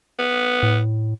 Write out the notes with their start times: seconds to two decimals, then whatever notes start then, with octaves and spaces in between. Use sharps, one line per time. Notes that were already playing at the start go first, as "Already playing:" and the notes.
0.19 B3
0.63 A2